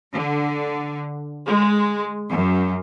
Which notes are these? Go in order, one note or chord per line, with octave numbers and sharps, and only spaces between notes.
D3
G#3
F#2